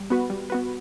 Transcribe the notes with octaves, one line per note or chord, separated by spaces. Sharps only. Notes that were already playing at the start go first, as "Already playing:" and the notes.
Already playing: G3
B3 F#4 B4
G3
B3 F#4 B4